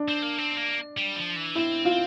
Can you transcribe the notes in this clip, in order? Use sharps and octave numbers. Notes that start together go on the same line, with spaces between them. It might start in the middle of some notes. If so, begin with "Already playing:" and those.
Already playing: D4
C4
A#3
C4
A#3
G3
F3
E3
C4 E4
F4